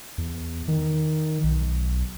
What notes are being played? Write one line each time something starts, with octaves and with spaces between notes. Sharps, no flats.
E2
D#3
B1